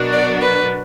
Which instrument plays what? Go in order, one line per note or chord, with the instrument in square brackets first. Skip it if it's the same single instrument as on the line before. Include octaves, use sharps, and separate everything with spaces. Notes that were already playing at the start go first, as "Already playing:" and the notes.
Already playing: [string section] B2 F#3 D4 F#4 A#4
[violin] D5
B4